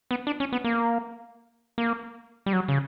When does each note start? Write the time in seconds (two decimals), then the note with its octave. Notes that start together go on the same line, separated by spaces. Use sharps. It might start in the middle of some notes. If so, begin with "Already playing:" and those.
0.11 B3
0.27 D4
0.40 C#4
0.53 B3
0.64 A#3
1.78 A#3
2.46 G3
2.53 F#3
2.68 C#3